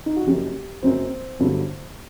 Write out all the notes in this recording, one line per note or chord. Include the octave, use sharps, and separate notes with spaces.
D#4
F#4
F#1 F#2 F#3 G4
F#1 F#2 F#3 C4
G1 G2 D3 F#3